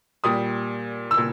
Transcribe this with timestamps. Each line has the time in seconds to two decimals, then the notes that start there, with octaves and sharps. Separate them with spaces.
0.24 A#2 G3 D#6
1.11 E6
1.17 A#2